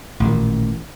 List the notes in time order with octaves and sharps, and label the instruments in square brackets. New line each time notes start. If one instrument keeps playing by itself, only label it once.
[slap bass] A1 A#2 D#3